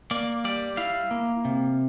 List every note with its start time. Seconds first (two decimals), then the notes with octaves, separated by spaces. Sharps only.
0.11 A#3 D5
0.45 G3 D5
0.77 E4 F5
1.11 A#3
1.45 C3